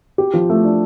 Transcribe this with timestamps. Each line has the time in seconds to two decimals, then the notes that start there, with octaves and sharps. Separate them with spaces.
0.18 G4
0.34 F3
0.49 A3
0.65 D4